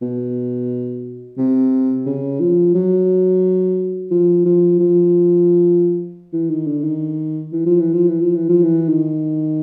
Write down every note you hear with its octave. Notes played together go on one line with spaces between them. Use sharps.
B2
C3
C#3
F3
F#3
F3
F3
F3
E3
D#3
D3
D#3
E3
F3
E3
F3
E3
F3
E3
F3
E3
D#3